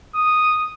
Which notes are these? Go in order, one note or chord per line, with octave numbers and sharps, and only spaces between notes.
D#6